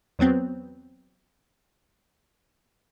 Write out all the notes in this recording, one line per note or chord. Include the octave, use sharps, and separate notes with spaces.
E2 F#3 B3 C4